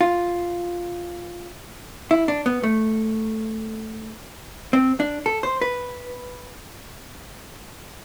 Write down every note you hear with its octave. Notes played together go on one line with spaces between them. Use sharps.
F4
E4
D4
B3
A3
C4
D4
A4
C5
B4